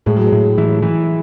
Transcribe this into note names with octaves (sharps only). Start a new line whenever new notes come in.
A2 G#3
F#3
G#3
A2
E3
E3